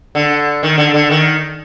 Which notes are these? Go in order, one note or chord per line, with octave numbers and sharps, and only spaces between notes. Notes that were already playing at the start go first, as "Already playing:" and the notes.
D3
D#3
D3
D3
D#3